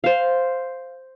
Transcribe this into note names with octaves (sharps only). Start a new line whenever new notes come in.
C5 F5